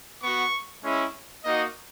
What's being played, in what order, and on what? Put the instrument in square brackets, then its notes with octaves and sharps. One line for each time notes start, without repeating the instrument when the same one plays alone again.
[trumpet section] B3 F#4 C#6
G#3 C#4 E4
A#3 D#4 F#4 D#5